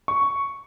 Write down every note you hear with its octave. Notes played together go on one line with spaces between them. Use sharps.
C#6